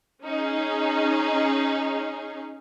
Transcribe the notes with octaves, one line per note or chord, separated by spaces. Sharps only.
C#4 D#4 G#4